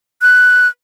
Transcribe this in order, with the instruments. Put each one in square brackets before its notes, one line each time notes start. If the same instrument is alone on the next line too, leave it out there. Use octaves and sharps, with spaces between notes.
[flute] F#6